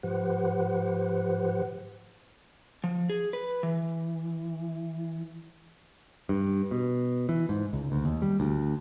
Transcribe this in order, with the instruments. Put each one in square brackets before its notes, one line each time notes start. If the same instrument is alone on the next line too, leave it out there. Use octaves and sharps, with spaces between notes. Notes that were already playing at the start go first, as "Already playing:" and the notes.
[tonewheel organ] G#2 F3 G4 B4 C5 F#5
[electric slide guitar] F3
G#4
B4
E3
[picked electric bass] G2
B2
E3
G#2
C#2
D2
D#2
G3
D2